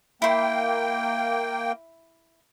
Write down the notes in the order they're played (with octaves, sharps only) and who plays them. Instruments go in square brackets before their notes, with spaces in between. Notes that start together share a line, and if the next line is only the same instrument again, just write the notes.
[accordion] A#3 G5 [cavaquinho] E4 C6